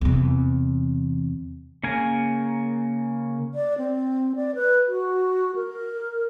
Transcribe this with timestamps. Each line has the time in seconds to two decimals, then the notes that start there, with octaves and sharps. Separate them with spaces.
0.01 E2 C3
1.83 C#3 A#3 A#4 G#5
3.54 D5
3.78 C4
4.36 D5
4.55 B4
4.88 F#4
5.56 A#4